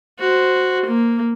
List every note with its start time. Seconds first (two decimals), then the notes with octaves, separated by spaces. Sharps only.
0.20 F#4 C5
0.87 A#3